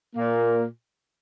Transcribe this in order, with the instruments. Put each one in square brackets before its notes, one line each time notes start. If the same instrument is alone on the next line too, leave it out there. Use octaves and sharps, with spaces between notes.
[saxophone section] A#2 A#3